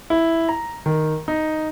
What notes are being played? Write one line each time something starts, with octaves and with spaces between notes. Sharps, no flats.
E4
A#5
D#3
D#4